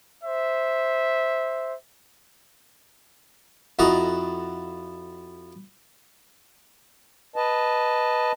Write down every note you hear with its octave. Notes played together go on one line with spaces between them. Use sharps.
C5 E5
F2 E4 F#4 A4 D#5 A#5
B4 D#5 A5